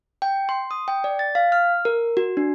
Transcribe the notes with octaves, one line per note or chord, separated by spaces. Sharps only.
G5
C6
D#6
G5
D5
A6
F5
F6
A#4
F#4
D4